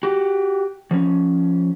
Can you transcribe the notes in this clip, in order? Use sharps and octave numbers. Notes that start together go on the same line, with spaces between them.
F#4 G4
F3 C#4